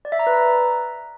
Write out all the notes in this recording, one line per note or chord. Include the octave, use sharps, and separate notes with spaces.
D5
E5
A#5
B4
A#5